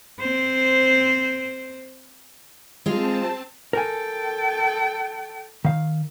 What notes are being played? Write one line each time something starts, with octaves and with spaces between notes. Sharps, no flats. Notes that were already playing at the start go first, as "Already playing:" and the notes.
C4 C5
G#3 C4 F4 A5
A4 A#4 G5 G#5
D#3 F5